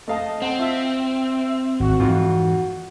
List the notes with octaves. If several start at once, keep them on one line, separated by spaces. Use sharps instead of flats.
A3 D#5 F5 A5
C4 F#5 A5
F4 E5
G#1 F#4
F2 G#2 E3 F4